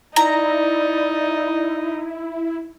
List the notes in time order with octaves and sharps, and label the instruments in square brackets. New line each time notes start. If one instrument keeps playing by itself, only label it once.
[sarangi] D#4 [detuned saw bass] E4 [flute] D5 [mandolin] A#5